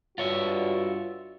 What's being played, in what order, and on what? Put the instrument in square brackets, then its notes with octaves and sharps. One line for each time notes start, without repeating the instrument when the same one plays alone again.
[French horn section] G2 F#4 [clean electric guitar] F4 C#5 E5